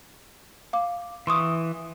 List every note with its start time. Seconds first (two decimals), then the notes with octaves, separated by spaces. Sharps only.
0.73 F5 D6
1.27 E3 C6 C#6 D#6